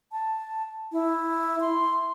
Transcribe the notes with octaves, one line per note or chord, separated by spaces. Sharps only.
A5
E4
C6